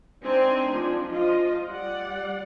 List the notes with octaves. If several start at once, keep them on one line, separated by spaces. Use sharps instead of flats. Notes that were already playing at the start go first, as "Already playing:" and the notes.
C4 D4 D#4 C5 G#5
F3 D4
F3 F4 D#5
G3 D5 F#5